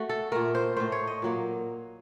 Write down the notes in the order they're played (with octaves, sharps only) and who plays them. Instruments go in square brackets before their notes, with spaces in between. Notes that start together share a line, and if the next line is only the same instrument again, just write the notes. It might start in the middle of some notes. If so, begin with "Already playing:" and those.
Already playing: [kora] A3 F#4
A4
A#2 A3 A#4
C5
A2 A3 C5
C#5
D#5
A#2 F#3 A#3